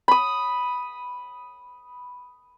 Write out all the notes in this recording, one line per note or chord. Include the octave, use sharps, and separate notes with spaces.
B5 D#6